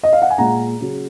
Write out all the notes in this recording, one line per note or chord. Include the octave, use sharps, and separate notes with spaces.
D#5
F5
F#5
G#5
A#2 G#3 F#5 A#5
C#3 F#3